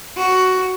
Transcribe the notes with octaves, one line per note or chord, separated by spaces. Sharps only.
F#4